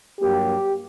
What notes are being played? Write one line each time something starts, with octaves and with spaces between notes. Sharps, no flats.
G2 F#3 A#3 G4